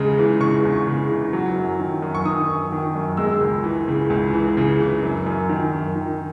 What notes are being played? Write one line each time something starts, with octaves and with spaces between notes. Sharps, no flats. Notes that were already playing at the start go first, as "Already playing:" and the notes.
Already playing: E2 C#3 G#3
E3
C#3 C#6
E2
C#3
E3
F#3
F#2
D#3
F#2
C#6
D#3 D#6
F#2
D#3
F#2
G#3 E6
C#2
E3
C#3
C#2
E3
C#3
E3
F#2
F#2
D#3
F#2
D#3